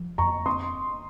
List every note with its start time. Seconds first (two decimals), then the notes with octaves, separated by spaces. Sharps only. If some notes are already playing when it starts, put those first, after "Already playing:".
Already playing: F3
0.18 F2 A#5 C#6
0.46 C4 C6 D#6